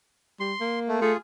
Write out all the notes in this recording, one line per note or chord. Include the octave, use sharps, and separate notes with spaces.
G3 C6
A#3
A3
A3 F4 G#4